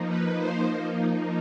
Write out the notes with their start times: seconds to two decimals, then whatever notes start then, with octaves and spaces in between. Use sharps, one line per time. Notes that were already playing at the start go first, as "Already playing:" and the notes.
Already playing: F3 A#3 D#4
0.09 B4
0.39 C5